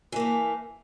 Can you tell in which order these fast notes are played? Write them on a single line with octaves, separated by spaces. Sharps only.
E3 A#3 A3